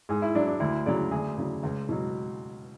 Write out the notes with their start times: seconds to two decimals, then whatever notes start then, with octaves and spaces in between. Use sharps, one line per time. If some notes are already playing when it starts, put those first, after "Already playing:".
0.09 G#2 G#4
0.22 E4
0.35 F#3 D4
0.48 D4
0.60 D2 E4
0.86 C#3 F#3 D5
1.11 D2 G#4
1.38 C#3 F#3
1.63 C#2
1.89 B2 F#3